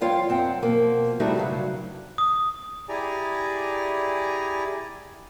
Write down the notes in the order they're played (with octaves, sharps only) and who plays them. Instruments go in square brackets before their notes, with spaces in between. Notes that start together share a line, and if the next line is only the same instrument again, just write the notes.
[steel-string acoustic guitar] G2 F3 F4 C#5 F5 G5
F#2 C4 F#5 G5
B2 F3 A#3
G3 A3 C4 D#4 E4 F#4
G2 C#3 F#3
[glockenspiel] D#6
[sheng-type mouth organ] E4 G4 G#4 D5 G#5 A#5